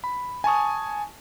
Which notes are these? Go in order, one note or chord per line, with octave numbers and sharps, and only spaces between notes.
B5
G#5 A5 C#6 D#6